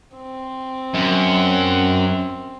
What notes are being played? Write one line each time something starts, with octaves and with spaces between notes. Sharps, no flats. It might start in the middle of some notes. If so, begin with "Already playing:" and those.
C4
F#2